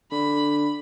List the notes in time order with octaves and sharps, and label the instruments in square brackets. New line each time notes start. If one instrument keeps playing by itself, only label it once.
[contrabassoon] D3 [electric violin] B5